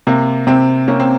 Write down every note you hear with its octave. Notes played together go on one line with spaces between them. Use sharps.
C3 A#3
C3 C4
A#3 C#4
C4